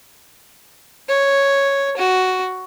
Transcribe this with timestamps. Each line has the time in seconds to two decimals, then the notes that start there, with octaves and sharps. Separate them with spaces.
1.09 C#5
1.97 F#4